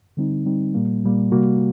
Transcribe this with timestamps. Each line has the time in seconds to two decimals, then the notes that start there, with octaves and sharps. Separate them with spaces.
0.17 D3 G3 C4 D#4
0.46 D3 G3 C4 D#4
0.74 A#2 G3 A#3
1.04 A#2 G3 A#3
1.32 C3 G3 A#3 F#4